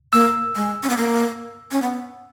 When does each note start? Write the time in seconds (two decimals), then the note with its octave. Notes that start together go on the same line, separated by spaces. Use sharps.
0.13 A#3 E6
0.56 G#3
0.83 C#4
0.90 B3
0.97 A#3
1.72 C#4
1.82 B3